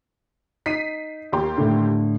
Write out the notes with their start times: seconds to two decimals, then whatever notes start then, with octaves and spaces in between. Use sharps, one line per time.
0.66 D#4 B6 C7 D#7
1.32 D#2 G4 C6
1.58 A2 D3